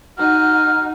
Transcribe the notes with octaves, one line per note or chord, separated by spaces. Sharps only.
D#4 F#4 F#5 F6